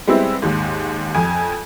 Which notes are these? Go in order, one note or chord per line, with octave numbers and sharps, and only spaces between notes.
G3 G#3 B3 C4 E4
D#2 G#2
F2 G#5